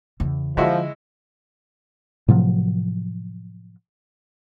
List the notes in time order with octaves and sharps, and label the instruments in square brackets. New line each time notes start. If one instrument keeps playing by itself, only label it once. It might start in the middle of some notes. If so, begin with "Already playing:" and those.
[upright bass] E2 C#3
[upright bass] D3 [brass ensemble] F3 [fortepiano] G#3 E4 F#4
[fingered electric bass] A2 C3 F3 F#3